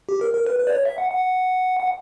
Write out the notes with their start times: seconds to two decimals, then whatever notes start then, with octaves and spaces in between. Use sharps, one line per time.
0.09 G4
0.21 A#4
0.34 A#4
0.47 B4
0.59 B4
0.67 D5
0.72 C#5
0.85 E5
0.98 F#5
1.10 F#5
1.80 F#5